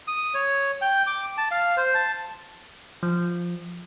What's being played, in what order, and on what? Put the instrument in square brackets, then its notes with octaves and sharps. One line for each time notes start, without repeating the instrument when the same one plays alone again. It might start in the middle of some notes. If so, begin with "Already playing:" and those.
[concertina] D#6
C#5
G5
D6
A5
F5
C5
A5
[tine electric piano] F3